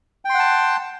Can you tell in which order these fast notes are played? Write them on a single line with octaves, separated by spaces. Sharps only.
G5 C6 F#5 A5